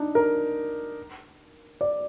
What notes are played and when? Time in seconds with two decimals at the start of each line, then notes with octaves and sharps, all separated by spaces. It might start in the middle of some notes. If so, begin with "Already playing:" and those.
Already playing: D4 D#4
0.15 A#4
1.81 D5